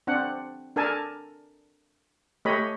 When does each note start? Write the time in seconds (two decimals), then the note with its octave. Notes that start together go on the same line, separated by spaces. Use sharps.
0.07 C4 D4 F#5
0.76 D4 A4 A#4 G#5 A5
2.45 A3 G4 C#5 D#5 B5